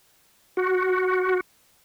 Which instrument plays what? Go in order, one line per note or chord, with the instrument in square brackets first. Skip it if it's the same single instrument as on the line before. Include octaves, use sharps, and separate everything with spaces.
[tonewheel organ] F#4